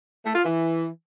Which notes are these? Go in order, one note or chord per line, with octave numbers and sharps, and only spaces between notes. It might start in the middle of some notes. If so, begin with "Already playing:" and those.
A3
F4
E3